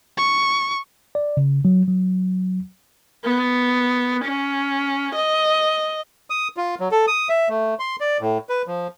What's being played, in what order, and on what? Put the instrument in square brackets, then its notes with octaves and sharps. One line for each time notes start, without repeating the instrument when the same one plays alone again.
[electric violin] C#6
[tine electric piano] D5
C#3
F#3
F#3
[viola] B3
C#4
D#5
[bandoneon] D#6
F4
F#3
A4
D#6
E5
A3
C6
D5
A2
B4
F3